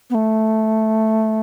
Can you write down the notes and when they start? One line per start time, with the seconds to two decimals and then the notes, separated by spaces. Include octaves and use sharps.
0.10 B3
0.15 A3